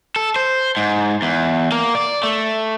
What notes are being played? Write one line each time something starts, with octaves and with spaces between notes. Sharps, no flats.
A4
C5
G#2
E2
A#3
D5
A3